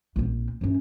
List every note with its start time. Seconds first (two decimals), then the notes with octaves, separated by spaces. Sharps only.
0.16 A#1 C4
0.61 G2 C#4